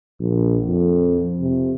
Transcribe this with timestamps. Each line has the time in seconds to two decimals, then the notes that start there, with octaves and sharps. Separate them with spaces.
0.21 A#1
0.66 F2
1.41 C3